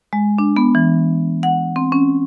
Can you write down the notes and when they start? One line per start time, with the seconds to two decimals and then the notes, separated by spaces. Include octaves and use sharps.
0.13 G#3
0.39 D4
0.57 B3
0.75 E3
1.43 F#5
1.76 C4
1.92 C#4